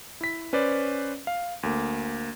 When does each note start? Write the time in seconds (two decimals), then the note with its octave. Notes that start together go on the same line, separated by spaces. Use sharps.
0.21 E4 B6
0.53 C#4 B4 C5 D5
1.27 F5
1.63 D2 A#3